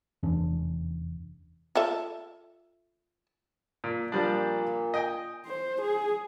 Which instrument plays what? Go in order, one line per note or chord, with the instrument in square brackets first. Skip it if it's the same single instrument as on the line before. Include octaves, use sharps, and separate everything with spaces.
[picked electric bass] F1 E2 C#4 D4
[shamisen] F4 A4 E5
[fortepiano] A#2
[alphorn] A#2 [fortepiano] F3 G3 D4
[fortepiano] D#5 G5 G#5
[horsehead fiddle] C5
G#4